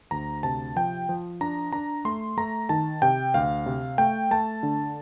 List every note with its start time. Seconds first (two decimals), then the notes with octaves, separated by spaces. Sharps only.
0.11 D2 A#5
0.43 C3 A5
0.76 F3 G5
1.09 F3
1.41 D4 A#5
1.72 D4 A#5
2.05 A3 C6
2.37 A3 A#5
2.69 D#3 A5
3.02 C3 G5
3.34 D2 F5
3.66 C3
3.98 A3 G5
4.31 A3 A5
4.63 D3